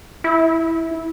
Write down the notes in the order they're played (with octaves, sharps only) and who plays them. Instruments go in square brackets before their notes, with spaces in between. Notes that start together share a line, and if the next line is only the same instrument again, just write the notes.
[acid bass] E4